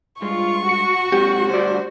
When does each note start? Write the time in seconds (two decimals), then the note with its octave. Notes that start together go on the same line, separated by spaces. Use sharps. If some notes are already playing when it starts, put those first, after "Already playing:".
0.22 G2 G#3 F4 C#6
0.69 F#4 C#7
1.12 G#2 C3 F#3 G4
1.50 D2 G2 C5 D5